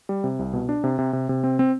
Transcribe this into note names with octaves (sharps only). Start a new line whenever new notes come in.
G3
C3
C2
B2
D4
C3
C3
C3
C3
C4
C4